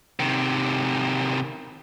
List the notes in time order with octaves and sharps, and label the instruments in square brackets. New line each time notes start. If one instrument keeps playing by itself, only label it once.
[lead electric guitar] C3 D#3